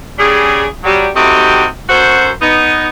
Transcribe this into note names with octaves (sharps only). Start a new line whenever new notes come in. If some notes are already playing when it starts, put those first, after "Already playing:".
C#3 G3 D4 G#4
F#3 G3
C3 G3 A3 D#4 F#4 G4
F#2 F#4 A4 C5
B3 D#4